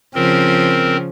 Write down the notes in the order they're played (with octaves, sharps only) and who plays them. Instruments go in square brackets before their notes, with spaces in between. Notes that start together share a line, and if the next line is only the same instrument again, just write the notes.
[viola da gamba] C#3 F3 [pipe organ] C4 A#4